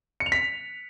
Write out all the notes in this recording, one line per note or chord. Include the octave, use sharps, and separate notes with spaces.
C#7
F7
B6